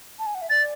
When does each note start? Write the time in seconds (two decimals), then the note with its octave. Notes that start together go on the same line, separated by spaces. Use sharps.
0.19 A5
0.26 G#5
0.35 F#5
0.42 E5
0.50 D5 A6